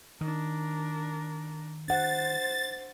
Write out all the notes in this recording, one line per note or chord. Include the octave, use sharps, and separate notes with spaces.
D#3 D4 A#4
D4 C5 F#5 A6